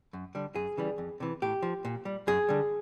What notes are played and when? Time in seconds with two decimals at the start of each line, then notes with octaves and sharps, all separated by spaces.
0.13 F#2
0.35 D3 G3
0.55 F#2 G#4
0.77 C#3 E3 G3
0.98 F2
1.20 C3 E3
1.42 A2 G4
1.63 F3
1.85 A#2
2.05 G3
2.27 F#2 G#4
2.49 D3 G3